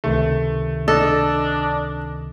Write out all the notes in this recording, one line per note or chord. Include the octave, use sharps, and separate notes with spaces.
C#2 C3 D#3 A3
D4 A4 D#5